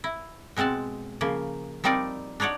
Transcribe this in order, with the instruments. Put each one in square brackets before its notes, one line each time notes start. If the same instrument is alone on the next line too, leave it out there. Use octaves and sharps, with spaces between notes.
[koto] E4
B2 G#3 C4 F#5 A5
C#3 F3 A#3
F3 G3 C4 D#4 A#4 D5
D4 D#4 C#5 D5 F#5